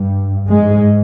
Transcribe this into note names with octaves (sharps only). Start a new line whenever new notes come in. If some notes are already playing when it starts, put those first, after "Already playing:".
Already playing: G2
G#2 G#3